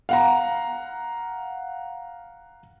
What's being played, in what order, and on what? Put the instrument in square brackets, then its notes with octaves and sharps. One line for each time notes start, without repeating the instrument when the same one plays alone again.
[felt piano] F5 F#5 A#5